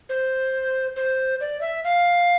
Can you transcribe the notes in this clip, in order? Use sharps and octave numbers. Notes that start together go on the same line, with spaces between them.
C5
C5
D5
E5
F5